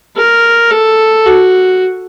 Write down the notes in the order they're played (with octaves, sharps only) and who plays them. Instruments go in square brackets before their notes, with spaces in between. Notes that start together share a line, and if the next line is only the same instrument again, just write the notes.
[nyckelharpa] A#4
A4
F#4